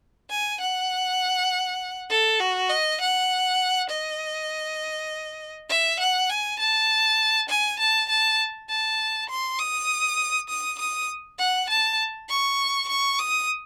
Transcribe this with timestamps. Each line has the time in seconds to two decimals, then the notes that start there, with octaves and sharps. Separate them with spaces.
0.30 G#5
0.61 F#5
2.10 A4
2.40 F#4
2.69 D#5
3.01 F#5
3.90 D#5
5.69 E5
6.00 F#5
6.29 G#5
6.59 A5
7.49 G#5
7.80 A5
8.09 A5
8.69 A5
9.29 C6
9.59 D#6
10.49 D#6
10.78 D#6
11.39 F#5
11.69 A5
12.29 C#6
12.89 C#6
13.19 D#6